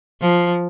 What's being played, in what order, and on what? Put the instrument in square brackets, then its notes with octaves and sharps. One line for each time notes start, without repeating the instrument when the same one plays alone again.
[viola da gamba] F3